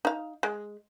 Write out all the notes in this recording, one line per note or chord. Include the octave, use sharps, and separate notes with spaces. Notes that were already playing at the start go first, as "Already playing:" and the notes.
D#4 F5
G#3